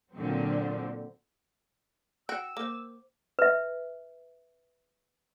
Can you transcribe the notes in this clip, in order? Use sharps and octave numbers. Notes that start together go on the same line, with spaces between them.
A#2 D3 F#3 C4
F#4 F#5 G5 E6
A#3 C5 D6
B4 E5